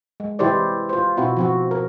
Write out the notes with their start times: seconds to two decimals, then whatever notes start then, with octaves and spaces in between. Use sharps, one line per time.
0.20 G#3
0.39 C3 E3 E4 G4 C5 D5
0.89 F4 C5
1.17 B2 C4 E4 F#4
1.37 F3 C4 F#4
1.71 A#4